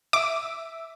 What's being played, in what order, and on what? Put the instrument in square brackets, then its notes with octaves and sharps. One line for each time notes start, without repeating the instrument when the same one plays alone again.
[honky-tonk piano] E5 [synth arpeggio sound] D6